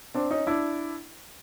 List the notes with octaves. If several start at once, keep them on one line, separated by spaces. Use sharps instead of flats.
C4 D4
C#4 D#4
D4 E4